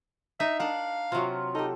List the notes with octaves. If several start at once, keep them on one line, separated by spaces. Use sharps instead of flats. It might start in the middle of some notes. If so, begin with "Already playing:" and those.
D#4 E5
D4 A#4 F5 F#5
C3 F#3 F4 F#4
D#4 G4 A4